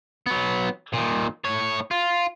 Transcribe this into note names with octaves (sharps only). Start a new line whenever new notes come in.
F#3 B3
A#2 D#3
A2 C#5
F4